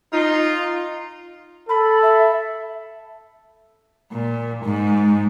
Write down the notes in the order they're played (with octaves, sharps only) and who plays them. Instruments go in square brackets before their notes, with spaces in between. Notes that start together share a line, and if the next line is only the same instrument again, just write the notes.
[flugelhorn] D#4 [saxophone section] F4
[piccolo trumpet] A4 [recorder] B5
[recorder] E5
[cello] A#2
G#2